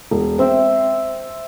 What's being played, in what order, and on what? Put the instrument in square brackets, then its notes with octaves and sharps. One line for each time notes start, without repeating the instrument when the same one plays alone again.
[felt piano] E1
[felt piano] C4 [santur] C5 E5 G5